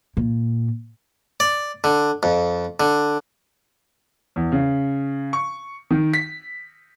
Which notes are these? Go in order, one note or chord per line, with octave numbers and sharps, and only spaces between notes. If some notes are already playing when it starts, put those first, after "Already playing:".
A#2
D5
D3
F2
D3
E2
C#3
C#6
D#3
B6